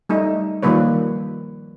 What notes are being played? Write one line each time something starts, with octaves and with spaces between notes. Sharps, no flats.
G3 A3 D#4
D#3 F3 G3 A#3 B4 C#5